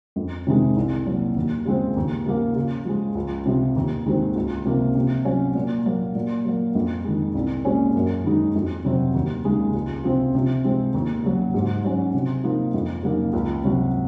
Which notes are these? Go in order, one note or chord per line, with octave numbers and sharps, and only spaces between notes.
F2
C3 D#3 G#3
C2
A#2 F#3
D#2
C#3 F3 G#3 C4
D#2
C#3 F3 A#3
C#3
F3 G#3
C#2
C3 F3
D#2
D#3 G#3 C4 F#4
C#2
C3 F3 A#3 F4
C3
F#3 C#4 F4
A#2
F#3 A#3
A#2
F#3 A#3
F2
D#3 G#3
C2
A#2 G#3 C#4 F#4
F#2
D#3 G#3 D#4 F#4
F2
C3 F#3 C4
D#2
C#3 G#3 D#4
C#2
C3 F3 C4
C3
F3 G#3 C4
D#2
C#3 F#3
G#2
F#3 C#4
C3
F3 A#3 D#4
F2
C#3 F#3 A#3 D#4
C#2
C3 F#3